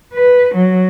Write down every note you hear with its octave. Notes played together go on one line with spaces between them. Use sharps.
B4
F#3